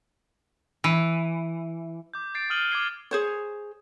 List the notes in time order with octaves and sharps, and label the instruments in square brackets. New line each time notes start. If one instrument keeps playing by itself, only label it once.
[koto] E3
[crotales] D6 G6
G6 A6 C7 D7
D#6 F6 C7 D#7 F#7 G7
D6 F6 G#6 C7 G7
[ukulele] G#4 C5 C#5